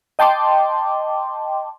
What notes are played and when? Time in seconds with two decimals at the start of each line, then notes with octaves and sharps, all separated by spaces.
0.19 D#5 G5 A5 C6 D6